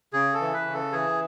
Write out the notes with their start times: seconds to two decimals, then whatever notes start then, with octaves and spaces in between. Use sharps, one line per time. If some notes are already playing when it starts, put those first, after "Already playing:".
0.13 C#3 G#4
0.34 A4
0.41 E3
0.53 B4
0.67 C#3
0.74 A4
0.92 E3 G#4